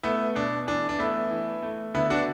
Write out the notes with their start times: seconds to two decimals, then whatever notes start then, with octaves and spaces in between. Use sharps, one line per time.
0.03 A3 B3 E4
0.35 B2 D4
0.67 E3 D4
0.89 D4
0.99 A3 B3 E4
1.31 E3
1.63 A3
1.94 D3 B3 E4
2.10 D4 F#4